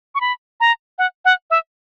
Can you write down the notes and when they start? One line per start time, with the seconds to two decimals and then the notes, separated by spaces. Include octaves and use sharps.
0.15 C#6
0.21 B5
0.60 A#5
0.98 F#5
1.25 F#5
1.50 E5